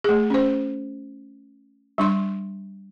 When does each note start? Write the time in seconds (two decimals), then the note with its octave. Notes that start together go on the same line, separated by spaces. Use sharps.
0.04 A3 G#4
0.30 C#4 C5
1.98 G3 D4 C6